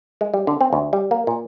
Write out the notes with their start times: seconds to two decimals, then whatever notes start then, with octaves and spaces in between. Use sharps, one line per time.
0.21 G#3
0.34 G3
0.47 D3
0.61 C4
0.73 D2
0.93 G3
1.11 A#3
1.27 A#2